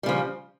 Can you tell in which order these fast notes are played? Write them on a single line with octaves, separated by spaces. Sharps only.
G3 C#3 F3